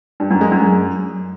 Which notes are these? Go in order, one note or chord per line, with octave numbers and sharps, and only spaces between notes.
G2
F#2
G#3
F#2